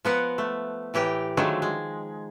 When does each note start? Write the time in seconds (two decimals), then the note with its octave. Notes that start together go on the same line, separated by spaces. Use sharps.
0.05 F3 B3 A#4 F#5
0.38 A3
0.94 A2 E3 G4 A#4 G5
1.37 D3 D#3 F3 F#3 G#3 A3
1.62 G#3